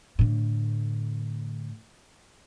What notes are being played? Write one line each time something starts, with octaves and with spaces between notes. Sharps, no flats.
A2 D3